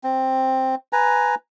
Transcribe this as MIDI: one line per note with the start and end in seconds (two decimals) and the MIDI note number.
0.04 0.75 60
0.93 1.35 71
0.93 1.35 80
0.93 1.35 82